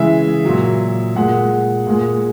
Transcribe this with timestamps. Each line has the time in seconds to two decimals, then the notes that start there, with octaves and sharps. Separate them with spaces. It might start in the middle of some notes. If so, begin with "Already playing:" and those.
Already playing: C#3 E3 G#3 E5
0.45 A#2 F#3
1.16 A#2 G#3 F#5
1.87 A#2 G#3